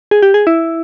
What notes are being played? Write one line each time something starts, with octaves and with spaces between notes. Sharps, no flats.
G#4
G4
G#4
E4